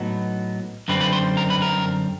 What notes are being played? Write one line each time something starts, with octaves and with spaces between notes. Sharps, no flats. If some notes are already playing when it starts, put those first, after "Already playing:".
Already playing: A2 F#3 B3 D#4
F#2 D3 G3 C4 B4
B4
C5
A#4
B4
A#4